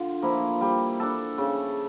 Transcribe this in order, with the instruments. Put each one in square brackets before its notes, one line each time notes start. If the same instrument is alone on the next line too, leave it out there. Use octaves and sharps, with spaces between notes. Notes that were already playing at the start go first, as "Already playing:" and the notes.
Already playing: [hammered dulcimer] D3 F4
F3 A#3 E4
G3
D4 A4
C#3